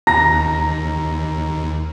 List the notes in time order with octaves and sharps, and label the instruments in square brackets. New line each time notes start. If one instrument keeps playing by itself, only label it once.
[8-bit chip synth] D#2 [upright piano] A#5 A#6